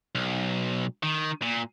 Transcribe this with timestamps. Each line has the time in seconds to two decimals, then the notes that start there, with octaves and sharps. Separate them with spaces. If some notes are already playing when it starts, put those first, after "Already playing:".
0.15 B1
1.03 D#3
1.42 A#2